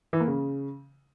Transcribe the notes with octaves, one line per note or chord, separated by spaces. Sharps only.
E3
A#3
C#3